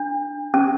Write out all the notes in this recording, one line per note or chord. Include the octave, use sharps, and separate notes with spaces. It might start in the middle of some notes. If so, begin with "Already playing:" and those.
Already playing: D4
C#4